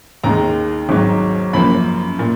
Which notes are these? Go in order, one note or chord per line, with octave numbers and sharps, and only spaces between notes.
D#2 D#3 G#3 A#5
G#1 G#2 F#3
F#2 F3 A#3 B5
A#2